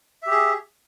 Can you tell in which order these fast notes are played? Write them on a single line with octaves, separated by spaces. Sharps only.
E5 G4 G#4